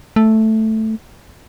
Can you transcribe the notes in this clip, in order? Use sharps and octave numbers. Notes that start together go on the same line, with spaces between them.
A3